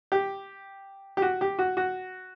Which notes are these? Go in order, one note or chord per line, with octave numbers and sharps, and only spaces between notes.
G4
G4
F#4
G4
F#4
F#4